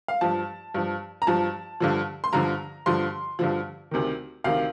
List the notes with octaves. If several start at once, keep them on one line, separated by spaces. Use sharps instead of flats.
F5
G2 F3 A5
G2 F3
A#5
G2 F3 A5
G2 D3 F3
C6
G2 D3 F3 A#5
G2 D3 F3 C6
G2 D3 F3
D2 C3 D#3
D2 C3 D#3 F5